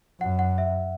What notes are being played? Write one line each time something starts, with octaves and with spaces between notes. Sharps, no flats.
F#2 F#5
F#5
E5